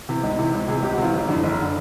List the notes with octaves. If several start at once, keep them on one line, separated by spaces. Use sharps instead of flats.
C3 E3 E4
C#2 D#4
C3 E3 E4
C#2
C3 E3 G#4
C#2 G4
F#4
C3 E3 F4
F#1 D#4
F2 D3 E4
F#1
D3